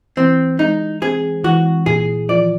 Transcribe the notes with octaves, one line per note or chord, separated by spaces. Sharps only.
E3 C4
G#3 D#4
C4 G#4
E3 F#4
A#2 G#4
F3 D5